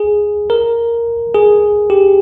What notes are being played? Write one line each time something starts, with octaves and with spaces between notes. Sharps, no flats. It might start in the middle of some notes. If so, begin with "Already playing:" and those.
Already playing: G#4
A#4
G#4
G4